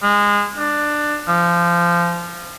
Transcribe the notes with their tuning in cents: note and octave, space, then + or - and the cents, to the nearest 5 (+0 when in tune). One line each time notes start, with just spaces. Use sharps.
G#3 -20
D4 +15
F3 -20